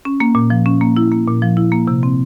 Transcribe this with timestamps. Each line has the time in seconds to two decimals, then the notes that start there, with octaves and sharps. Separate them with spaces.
0.05 C#4
0.20 A#3
0.35 A#2
0.50 F3
0.66 C#4
0.81 A#3
0.97 E4
1.11 A#3
1.27 A#2
1.42 F3
1.57 E4
1.72 A#3
1.88 C3
2.03 C4